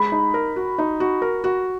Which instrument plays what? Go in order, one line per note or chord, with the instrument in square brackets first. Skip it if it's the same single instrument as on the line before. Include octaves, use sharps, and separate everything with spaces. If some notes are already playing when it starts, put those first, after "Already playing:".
Already playing: [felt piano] G#3 [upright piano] B5
[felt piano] D#4
A#4
F#4
D#4
F#4
A#4
F#4